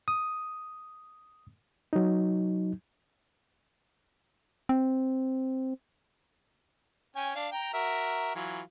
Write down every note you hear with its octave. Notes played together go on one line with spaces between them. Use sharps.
D#6
F#3 D#4
C4
C#4 G5 G#5
D4 F5
G5 A#5
F#4 A#4 E5
E3 F#3 F4